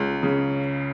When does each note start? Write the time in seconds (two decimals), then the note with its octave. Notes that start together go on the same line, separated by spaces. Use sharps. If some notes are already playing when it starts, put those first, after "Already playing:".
Already playing: C#2
0.23 C#3